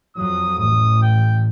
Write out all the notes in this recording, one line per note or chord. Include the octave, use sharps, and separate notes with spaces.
F2 F#3 D#6
A1 D#6
G5